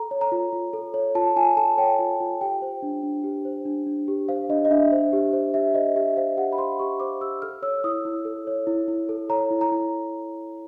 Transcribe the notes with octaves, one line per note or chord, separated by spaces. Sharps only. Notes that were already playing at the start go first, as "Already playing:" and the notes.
Already playing: A4 A#5
C#5
A#5
F4
F4
A4
C#5
F4 A5
F4 G#5
A4 A5
C#5 G5
F4
F4
G4 G5
C5
D4
D4
G4
C5
D4
D4
G4
C5 F5
D4 D#5
D#5
D4 E5
C5
G4
C5
G4 E5
C5 D#5
G4 E5
C5 F5
G4 F#5
B5
C5 C6
G4 C#6
C5 D6
G4 E6
A4 F6
C#5 E6
E4 D#6
E4
A4
C#5
E4
E4
A4
C#5 A#5
E4
A#5
E4